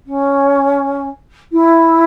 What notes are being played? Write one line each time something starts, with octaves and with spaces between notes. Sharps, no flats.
C#4
E4